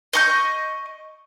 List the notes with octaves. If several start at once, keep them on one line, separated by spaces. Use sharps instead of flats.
D#5 C#6 G6